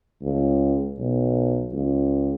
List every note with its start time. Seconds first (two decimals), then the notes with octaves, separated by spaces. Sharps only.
0.21 C#2
0.98 B1
1.72 C#2